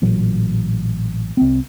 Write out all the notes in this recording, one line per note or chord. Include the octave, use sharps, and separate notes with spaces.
A1 A#2 F#3
C2 C4